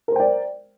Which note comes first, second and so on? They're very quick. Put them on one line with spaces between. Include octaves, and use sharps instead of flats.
A#4 C5 G5 D5